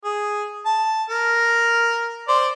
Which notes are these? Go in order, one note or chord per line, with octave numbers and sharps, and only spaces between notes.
G#4
A5
A#4
C5 D5